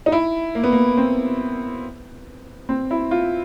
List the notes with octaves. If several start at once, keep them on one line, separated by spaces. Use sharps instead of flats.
D#4
E4
A#3
B3
A#3
C4
C4
E4
F4